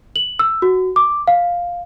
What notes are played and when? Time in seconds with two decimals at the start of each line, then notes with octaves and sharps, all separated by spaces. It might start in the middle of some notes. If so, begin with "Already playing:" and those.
0.16 F#7
0.39 E6
0.62 F#4
0.96 D6
1.27 F5